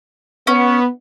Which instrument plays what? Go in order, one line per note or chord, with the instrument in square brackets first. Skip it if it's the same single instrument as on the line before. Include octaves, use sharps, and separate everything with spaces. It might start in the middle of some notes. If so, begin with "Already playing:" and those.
[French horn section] B3 [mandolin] C#4